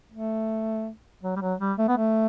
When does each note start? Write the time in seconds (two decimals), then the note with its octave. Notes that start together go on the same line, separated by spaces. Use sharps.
0.12 A3
1.23 F#3
1.36 G3
1.41 F#3
1.60 G3
1.78 A3
1.88 B3
1.97 A3